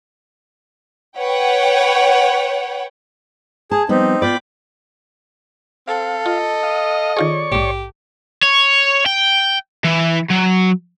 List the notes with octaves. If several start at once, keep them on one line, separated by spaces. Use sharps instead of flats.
B4 C#5 F#5 G5
G#4 A5
F3 G3 B3 C4 D#4
B3 F4 D5 G5 B5 D6
C4 A4 F5
F4 D#5
F5 D#6
D#3 F4 G#4 C#5 D5 C#6
A#1 G#2 G4
C#5
G5
E3
F#3